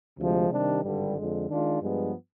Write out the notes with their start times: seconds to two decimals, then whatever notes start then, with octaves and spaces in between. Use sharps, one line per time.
0.17 D2 C3 F3 G#3
0.50 C3 D#3 G3 D4
0.83 G#1 G2 D3 G3
1.15 F2 D3 G#3
1.48 D#3 G#3 D4 F4
1.80 G2 F3 G#3 B3